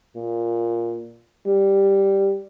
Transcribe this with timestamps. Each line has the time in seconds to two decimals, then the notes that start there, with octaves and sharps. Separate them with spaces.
0.16 A#2
1.47 G3